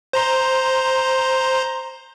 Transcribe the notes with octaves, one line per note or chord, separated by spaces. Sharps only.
C5 A#5 C6